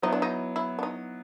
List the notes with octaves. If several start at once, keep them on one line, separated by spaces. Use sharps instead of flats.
F#3 B3 D#4 E4
D4
D#4
E4
D4
D#4